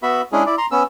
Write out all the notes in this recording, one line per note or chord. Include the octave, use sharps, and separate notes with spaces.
B3 F#4 E5 B5
G#3 C#4 D4 E4 G#4
E4 D5
A#5 C6
B3 C#4 E6